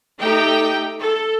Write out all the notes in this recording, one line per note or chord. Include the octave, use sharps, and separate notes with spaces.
A3 D#4 G4 G5
A4